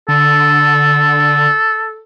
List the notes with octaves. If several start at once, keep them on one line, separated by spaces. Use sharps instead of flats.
D3 A4